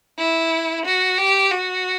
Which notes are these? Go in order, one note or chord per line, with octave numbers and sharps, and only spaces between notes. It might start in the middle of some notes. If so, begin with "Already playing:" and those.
E4
F#4
G4
F#4